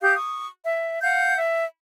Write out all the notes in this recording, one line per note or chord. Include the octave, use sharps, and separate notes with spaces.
G4 F5 D#6 G6
C#6 D#6
E5
F5 F#5 G6
E5